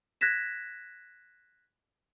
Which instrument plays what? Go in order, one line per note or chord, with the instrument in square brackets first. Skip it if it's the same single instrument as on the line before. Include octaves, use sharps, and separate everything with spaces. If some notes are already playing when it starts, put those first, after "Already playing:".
[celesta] F#6 G#6 A#6 B6 E7